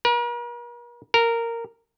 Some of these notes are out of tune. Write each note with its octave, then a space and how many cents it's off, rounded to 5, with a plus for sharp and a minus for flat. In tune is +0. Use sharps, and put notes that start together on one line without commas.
A#4 +45
A#4 -10